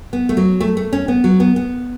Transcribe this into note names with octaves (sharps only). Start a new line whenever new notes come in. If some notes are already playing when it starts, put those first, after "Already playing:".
B3
A3
F#3
A3
A3
C#4
B3
F#3
B3
B3